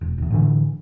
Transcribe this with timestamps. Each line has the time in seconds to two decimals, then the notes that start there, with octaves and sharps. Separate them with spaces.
0.01 E1
0.18 D1 E2
0.30 A2 D3 E3